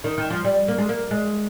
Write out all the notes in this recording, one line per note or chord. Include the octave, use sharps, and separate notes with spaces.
D#3
D#3
F3
G3
A#3
G#3
A#3
G#3